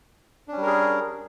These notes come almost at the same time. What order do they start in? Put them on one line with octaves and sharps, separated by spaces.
D4 C#4 G3 A#4 G#4